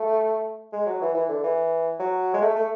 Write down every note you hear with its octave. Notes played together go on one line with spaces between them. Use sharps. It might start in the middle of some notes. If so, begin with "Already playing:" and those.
Already playing: A3
G#3
F#3
E3
E3
D3
E3
F#3
G#3
A3
A3